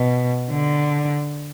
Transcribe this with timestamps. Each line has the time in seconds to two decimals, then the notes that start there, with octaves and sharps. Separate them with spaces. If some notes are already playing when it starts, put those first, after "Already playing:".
Already playing: B2
0.51 D3